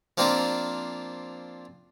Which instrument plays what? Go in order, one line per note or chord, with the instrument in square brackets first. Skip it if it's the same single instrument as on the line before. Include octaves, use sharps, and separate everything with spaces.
[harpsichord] F3 A#3 C4 D4 F4 A#4